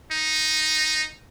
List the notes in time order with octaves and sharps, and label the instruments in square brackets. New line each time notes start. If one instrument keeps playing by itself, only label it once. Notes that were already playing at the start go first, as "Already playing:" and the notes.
[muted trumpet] D#4